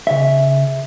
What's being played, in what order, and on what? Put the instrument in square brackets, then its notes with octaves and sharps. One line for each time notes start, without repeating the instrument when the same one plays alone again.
[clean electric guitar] C#3 E5